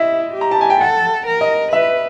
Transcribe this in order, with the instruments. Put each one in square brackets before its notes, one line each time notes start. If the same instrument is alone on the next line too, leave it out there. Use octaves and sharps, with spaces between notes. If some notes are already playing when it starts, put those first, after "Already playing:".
Already playing: [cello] E4 [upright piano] D#5 E5
[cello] G4
[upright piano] A#5
A5
G#5
G5
[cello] A4 [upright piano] F#5
[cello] A#4
[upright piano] D#5
[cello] B4 [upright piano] E5